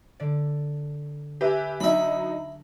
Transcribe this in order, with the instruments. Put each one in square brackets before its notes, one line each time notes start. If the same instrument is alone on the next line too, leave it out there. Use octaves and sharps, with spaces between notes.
[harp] D3 D5
[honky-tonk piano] G4 B4 E5 [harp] G#5 A#6
[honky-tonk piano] F#3 D#4 [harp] D4 [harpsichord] E5 B5